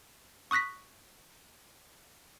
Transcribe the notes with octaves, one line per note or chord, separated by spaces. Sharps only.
C#6 D#6 F#6 A#6 B6